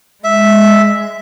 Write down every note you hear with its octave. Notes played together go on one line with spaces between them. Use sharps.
G#3 E5